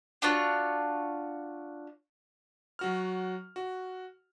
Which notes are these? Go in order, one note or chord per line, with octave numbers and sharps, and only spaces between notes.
D4 F4 F#4 C#5
F#3 F#4 F6
F#4